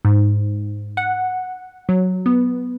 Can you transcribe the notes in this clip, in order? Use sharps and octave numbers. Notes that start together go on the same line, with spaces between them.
G#2
F#5
F#3
B3